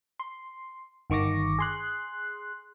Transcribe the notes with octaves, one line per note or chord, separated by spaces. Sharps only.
C6
G1 D#3 C#6 D6 A#6
G#4 C6 F#6